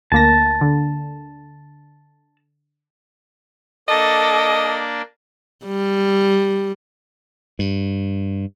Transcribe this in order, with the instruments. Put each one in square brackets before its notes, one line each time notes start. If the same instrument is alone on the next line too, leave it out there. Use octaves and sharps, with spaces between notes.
[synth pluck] D2 A#3 A#6 [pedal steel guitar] A5
[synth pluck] D3
[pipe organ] A#3 D4 D5 [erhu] A4 [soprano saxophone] D#5
[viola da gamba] G3
[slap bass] G2